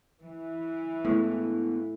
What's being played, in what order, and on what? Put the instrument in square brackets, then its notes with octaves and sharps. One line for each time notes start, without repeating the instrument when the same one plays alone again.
[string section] E3
[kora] A2 [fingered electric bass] G#3 B3